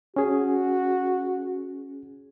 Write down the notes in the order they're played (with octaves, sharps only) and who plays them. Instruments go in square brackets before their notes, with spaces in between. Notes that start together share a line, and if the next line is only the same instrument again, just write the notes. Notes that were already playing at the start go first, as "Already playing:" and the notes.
[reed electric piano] C#4 G#4 [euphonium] F#4